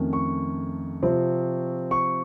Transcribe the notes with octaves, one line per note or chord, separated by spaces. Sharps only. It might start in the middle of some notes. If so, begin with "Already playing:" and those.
Already playing: F2 D#3 A3 C#4
C#6
C3 F3 C4
C#6